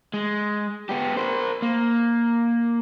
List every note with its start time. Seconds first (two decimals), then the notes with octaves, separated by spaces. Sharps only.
0.14 G#3
0.89 B3 G4
1.17 A#4 C5
1.62 A#3